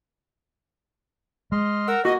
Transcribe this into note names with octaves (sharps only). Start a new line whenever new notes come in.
G#3 D#5 C6 F6
A#4 F#5 E6
A#3 F#4 D#5